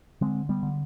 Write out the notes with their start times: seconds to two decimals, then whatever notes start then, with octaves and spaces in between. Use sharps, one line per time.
0.21 D3 G#3 C4
0.49 G3 B3
0.63 D3